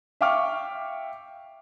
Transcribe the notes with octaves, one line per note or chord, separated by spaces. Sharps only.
E5 F5 G5 C#6 D6 F6